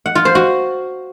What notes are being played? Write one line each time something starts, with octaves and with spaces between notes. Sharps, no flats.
F#5
F4
C5
F#4